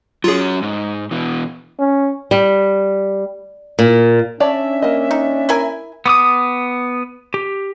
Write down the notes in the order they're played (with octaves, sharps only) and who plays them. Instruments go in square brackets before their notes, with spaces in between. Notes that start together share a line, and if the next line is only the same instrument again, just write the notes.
[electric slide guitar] F#3 C#4 [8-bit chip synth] F4 G#4
[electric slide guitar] G#2
B2 E3
[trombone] C#4
[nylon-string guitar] G3
A#2
[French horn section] C#4 D4 [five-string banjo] C#5 D5 A5 [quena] E5
[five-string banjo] A#3 D#5
[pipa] D#4
E4 A#4 G#5
[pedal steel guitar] B3 D6 D#6
G4